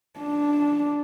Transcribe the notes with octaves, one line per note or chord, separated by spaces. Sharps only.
D4